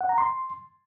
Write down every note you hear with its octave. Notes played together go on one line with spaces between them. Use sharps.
F#5
A#5
C6